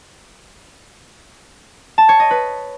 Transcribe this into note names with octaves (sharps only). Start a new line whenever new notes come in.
A5
C#5
D#5
B4